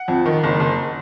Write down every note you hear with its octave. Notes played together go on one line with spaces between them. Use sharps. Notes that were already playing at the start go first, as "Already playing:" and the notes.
Already playing: F#5
F2
D#3
F#1
F#1